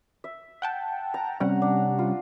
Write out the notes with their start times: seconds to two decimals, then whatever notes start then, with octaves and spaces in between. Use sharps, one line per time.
0.24 E5
0.62 F#5 G5 A5
1.14 A#5
1.40 C3 G3 C#4 F#5
1.62 D4
1.99 F4